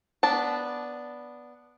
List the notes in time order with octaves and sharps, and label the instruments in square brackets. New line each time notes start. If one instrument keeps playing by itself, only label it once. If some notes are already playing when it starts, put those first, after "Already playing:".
[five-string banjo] B3 D4 A5